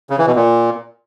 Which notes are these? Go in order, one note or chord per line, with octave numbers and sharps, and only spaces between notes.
C#3
E3
B2
A#2